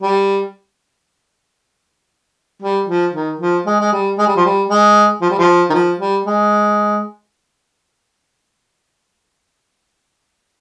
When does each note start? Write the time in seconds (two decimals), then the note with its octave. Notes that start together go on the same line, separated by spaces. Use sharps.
0.02 G3
2.62 G3
2.88 F3
3.13 D#3
3.39 F3
3.66 G#3
3.80 G#3
3.92 G3
4.18 G#3
4.27 G3
4.36 F3
4.45 G3
4.70 G#3
5.21 F3
5.30 G3
5.38 F3
5.70 D#3
5.74 F3
5.99 G3
6.26 G#3